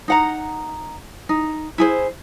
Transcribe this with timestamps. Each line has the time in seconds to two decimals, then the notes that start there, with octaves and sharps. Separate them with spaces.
0.08 D#4 F#5 A#5
1.29 D#4
1.78 E4 G#4 C5